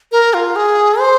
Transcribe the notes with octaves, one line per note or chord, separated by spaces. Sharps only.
A#4
F4
G#4
C5